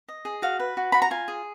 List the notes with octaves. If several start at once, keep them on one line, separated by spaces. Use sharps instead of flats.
D#5
G#4
F#4 F5
B4
F#4
F#4 B5
A#5
F4 G#5
G#4